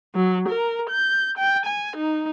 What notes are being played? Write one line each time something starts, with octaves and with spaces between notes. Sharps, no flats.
F#3
A#4
G6
G5
G#5
D#4